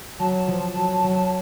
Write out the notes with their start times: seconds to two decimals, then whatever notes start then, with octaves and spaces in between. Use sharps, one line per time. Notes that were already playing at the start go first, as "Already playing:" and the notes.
0.19 F#3 A5
0.48 F3
0.76 F#3
1.04 F#3